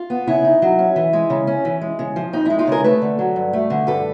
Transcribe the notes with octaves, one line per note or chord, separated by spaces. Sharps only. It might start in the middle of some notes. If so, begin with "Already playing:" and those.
Already playing: F4
B3
C#3 E4
D#4
F#3
C#4
E3
G#3
C#3
C#4
E3
G#3
C#3
F3
F2 D#4
G#3 E4
D#4 F4
C#3 G#4 A#4
A3 A4 B4
D3
F#3
G2
A3
D3
G2 A4 B4